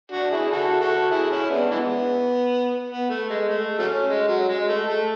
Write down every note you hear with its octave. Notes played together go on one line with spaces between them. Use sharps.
D4 F#4
E4 G#4
F#4 A4
F#4 A4
E4 G#4
C#4 E4
B3 D4
E3 G#3 B3
B3
A3
G#3
A3
F#3 A3 C#4
G#3
F#3
G#3
A3
A3